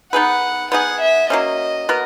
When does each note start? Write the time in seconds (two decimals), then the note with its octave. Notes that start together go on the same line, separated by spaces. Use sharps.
0.13 B3 D#4 G#4 B4 F#5
0.72 B3 D#4 G#4 F#5
1.01 E5
1.30 F#3 A#3 C#4 D#5
1.89 B3 F#4 A#4